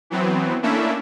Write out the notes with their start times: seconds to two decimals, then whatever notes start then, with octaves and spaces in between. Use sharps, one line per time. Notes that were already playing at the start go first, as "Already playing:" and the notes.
0.10 E3 F#3 B3 C4
0.62 A3 A#3 C#4 D4 E4 E5